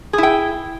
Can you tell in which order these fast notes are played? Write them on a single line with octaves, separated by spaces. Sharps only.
G#4 E4 G5